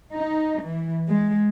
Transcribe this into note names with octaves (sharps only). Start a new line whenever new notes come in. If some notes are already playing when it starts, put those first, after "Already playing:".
D#4
E3
G#3